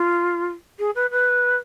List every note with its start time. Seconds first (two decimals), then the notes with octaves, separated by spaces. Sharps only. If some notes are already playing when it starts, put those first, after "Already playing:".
Already playing: F4
0.79 G#4
0.95 B4
1.10 B4